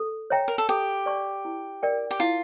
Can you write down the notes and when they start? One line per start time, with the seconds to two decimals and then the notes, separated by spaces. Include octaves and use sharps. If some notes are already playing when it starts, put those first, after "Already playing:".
Already playing: A4
0.30 C#5 E5 G5 A#5
0.48 A#4
0.58 A4
0.69 G4 A4
1.06 D5 A5 C#6
1.45 E4
1.83 A#4 D5 G5
2.11 G4
2.20 E4 F4